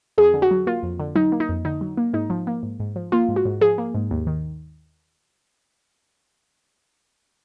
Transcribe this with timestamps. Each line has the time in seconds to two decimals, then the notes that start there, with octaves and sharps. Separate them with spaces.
0.18 F2 G#4
0.34 D3
0.42 F#4
0.51 F#3
0.67 A#3 F4
0.83 F2
1.00 D3
1.16 F#3 D#4
1.32 A#3
1.40 D#4
1.49 F2
1.65 D3 D#4
1.81 F#3
1.97 A#3
2.13 G#2 D#4
2.30 F3
2.47 A#3
2.63 G#2
2.80 G#2
2.96 F3
3.12 A#3 F4
3.29 G#2
3.36 F#4
3.45 G#2
3.61 F3 G#4
3.78 A#3
3.95 G#2
4.11 D#2
4.27 D#3